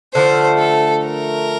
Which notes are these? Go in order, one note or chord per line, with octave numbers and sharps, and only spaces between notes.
D3 F3 A3 C5
A4
A#4